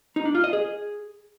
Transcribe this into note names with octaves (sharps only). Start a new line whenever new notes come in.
D#4
D4
F4
D#5
G#4